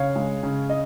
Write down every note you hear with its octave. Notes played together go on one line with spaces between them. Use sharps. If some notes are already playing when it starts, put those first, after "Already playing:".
Already playing: C#3 C#5 F5
G#3
C#3
D#5